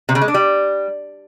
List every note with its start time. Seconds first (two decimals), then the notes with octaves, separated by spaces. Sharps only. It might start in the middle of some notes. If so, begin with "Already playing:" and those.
0.09 C3
0.15 C#3
0.22 G#3
0.28 D4
0.34 G3